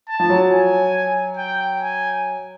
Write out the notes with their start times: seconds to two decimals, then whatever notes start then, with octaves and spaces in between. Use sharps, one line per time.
0.08 A5
0.20 F3
0.30 F#3
0.51 G#5
1.37 G5
1.80 G#5